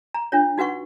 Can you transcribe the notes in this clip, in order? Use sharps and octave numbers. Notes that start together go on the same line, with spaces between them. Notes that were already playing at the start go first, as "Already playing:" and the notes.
A#5
D4 F4 C#5
D#4 F#4 B4 F#5 C#6